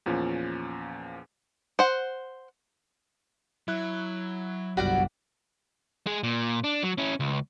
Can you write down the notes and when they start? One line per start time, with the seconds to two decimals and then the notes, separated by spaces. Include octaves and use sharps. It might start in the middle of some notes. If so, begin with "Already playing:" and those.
0.06 E2 A#2 F3 C#4
1.79 C5 F#5
3.68 F#3 E4 F#6
4.77 G1 C2 G3 F#4 D5 F#5
6.07 G#3 G#4
6.23 A#2
6.64 D4
6.83 F#3
6.98 C#4 E4
7.20 C#2